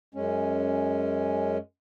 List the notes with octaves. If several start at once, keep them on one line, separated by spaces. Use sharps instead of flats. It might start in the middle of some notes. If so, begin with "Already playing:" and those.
F#2 G#3 C#4